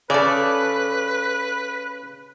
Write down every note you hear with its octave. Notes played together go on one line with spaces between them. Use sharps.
C#3 A4 B4 D5